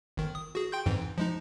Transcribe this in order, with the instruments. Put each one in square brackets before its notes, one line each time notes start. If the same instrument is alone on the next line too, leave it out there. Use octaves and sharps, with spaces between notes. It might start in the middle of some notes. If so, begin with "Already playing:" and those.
[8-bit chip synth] G1 D#3
D#6
F#4 G#4
G5 C6 G6
F2 G#2 E3
F3 G#3 D#4